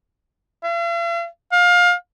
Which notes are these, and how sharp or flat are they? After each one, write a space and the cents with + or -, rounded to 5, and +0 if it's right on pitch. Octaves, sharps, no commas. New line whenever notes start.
F5 -45
F5 +25